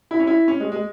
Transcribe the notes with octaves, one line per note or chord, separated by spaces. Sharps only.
E4
C#4
E4
C#4
G#3
G#3